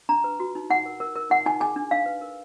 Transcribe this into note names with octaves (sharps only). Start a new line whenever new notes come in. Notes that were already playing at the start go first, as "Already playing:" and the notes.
D4 A#5
B4
F#4
D#4
D#4 F#5
A#4
A#4
A#4
D#4 F#5
D#4 G#5
G#4 G#5
D4
D4 F5
B4
A#4